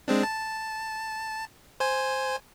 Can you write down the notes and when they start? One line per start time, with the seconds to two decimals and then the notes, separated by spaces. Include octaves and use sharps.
0.08 G#3 C4 D4
0.23 A5
1.80 C5 G#5